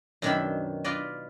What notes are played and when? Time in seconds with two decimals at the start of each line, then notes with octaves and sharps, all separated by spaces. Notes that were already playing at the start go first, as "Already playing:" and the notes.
0.22 F#2 B2 D#3 D4 E5 B5
0.84 F4 B4 D5 D#5